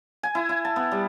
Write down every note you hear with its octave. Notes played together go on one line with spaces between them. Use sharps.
G#5
E4
E4
A5
B3
G3